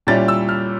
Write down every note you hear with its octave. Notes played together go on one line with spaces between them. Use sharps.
A#2 G3 C#4 E4 A6
E6
F6